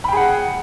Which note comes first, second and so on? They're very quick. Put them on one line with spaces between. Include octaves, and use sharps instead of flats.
B5 G5 G#4 F#5